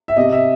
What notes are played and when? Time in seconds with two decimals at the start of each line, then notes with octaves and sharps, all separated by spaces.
0.08 E5
0.16 C3 D#5
0.32 E5